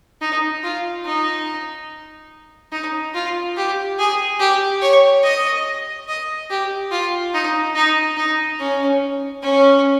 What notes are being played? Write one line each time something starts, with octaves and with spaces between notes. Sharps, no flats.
D#4
F4
D#4
D#4
F4
G4
G#4
G4
C#5
D#5
D#5
G4
F4
D#4
D#4
D#4
C#4
C#4